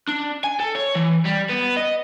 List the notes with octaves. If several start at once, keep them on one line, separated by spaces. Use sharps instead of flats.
D4
G#5
A4
C#5
E3
G3
B3
D#5